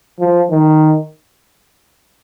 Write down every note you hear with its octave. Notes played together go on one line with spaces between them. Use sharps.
F3
D#3